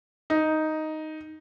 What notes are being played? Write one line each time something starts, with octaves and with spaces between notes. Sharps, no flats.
D#4